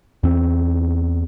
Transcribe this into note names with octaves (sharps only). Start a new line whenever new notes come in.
E2 C4